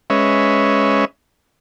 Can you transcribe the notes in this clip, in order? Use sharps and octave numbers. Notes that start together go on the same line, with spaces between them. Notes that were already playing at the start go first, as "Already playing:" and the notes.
G#3 C#4 B4 C#5 D#5 E5